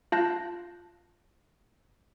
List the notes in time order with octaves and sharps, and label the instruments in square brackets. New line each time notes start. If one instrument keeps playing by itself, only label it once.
[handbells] F4 F5 A5 F#6 G6 A#6